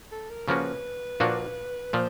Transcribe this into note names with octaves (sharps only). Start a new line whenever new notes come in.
A4
A#4
C#3 F3 A#3 C#4 F#4 B4
A#2 F3 A#3 D4 F#4
A#2 F3 C5